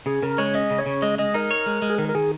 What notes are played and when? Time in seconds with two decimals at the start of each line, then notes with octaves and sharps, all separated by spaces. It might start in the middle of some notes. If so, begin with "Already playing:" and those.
0.06 C#3 G#4
0.22 C#3 A#4
0.38 G#3 C#5
0.54 C#4 D#5
0.70 C#3
0.78 C#5
0.86 C#3
1.02 G#3 D#5
1.18 G#3 D#5
1.34 D#4 A#4
1.51 C#5
1.66 G#3
1.82 G#3
1.90 G#4
1.98 D#3 A#4
2.09 A#4
2.15 D#3 G#4